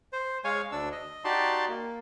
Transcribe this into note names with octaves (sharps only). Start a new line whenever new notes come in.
C5
G#3 C#5 F5 G#5
D2 D4 E6
D#5
D#4 F#4 G4 D5 A5 C6
A#3